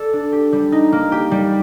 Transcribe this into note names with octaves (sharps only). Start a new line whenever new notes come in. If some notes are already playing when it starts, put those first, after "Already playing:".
Already playing: A4 D5
D4
G4
G3
D#4
A#3
G4
G3